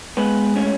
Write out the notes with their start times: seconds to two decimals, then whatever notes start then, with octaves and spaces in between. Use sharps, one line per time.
0.17 G#3 B3 B4
0.56 A2 C#4 C#5